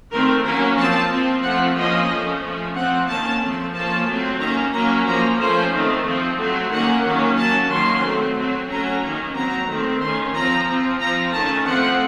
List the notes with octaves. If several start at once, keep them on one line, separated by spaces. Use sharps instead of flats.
D#3 A3 C4 A#4
F#3 A#3 C#4 A#4
F3 C4 A5
F3 C4
F3 A3 C4 F#5
F3 A#3 C#4 D#5
F3 A3 C#4
F3 A3 C#4
F3 C4 F#5
D#3 A#3 C#4 A5
F3 A3 C4
F3 A#3 C#4 A5
F#3 A3 C4
D#3 A#3 C#4 A#5
F#3 A#3 C#4 A#5
F3 A#3 C#4 A#5
F3 A3 C#4 C5
D#3 A3 C4
F3 C4
F#3 A3 C4
D#3 A#3 C#4 F#5
D#3 F#3 A#3 C#4
F#3 A#3 C#4 A5
D#3 F#3 A#3 C#4 C6
F#3 A3 C4
F#3 C4
F#3 A3 C#4 A#5
D#3 A#3 C#4
F#3 C4 A#5
D#3 A3 C4
D#3 A3 C#4 C6
F3 C4 A#5
F3 C4
F3 C4 A#5
D#3 A3 C#4 A5
F3 A3 C4 F#5